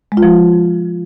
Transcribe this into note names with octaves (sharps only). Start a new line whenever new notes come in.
G#3
F4
F3